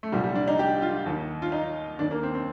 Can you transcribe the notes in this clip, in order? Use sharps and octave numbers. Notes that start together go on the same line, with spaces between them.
A3
C2 A#2 F3 G3
G3
D4
D#4
G4
F4
D#2 D#3
F4
D#4
D#2 D#3 D4
A#3
C4
C4